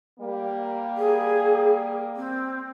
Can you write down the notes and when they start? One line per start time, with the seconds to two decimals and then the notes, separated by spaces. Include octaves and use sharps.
0.20 G3 A#3
0.97 G#4
2.16 C4